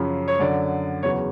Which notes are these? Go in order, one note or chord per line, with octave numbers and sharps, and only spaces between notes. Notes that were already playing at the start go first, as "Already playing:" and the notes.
Already playing: F#2 C#3 F3
C#5
F#2 D3 F#3 D5
E2 C#3 F#3 C#5